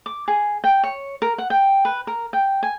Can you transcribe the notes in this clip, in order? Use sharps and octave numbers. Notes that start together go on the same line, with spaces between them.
D6
G#4
G5
C#5
A#4
F#5
G5
B4
A#4
G5
G#5